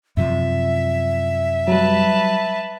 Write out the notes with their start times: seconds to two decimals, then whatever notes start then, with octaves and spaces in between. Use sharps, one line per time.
0.17 F#2 C3 F3 E5
1.68 F#3 G3 B4 A5